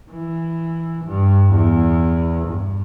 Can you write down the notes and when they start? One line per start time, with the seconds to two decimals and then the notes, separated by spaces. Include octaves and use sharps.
0.11 E3
1.05 G2
1.52 E2
2.47 G2